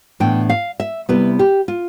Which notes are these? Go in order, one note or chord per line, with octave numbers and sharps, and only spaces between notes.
A2 E3 B3 D4 G5
F5
E5
C3 G3 B3 E4 B4
G4
F4